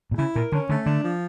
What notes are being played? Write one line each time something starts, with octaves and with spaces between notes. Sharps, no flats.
A#2
C#3 E4
A#2 A#4
D3 C#4
D3 A3
D3 D4
F3